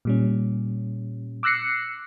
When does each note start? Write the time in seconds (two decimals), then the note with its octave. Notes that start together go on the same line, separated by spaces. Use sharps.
0.05 A#2 G3 C#4
1.43 D6 E6 F#6 A#6 C7 C#7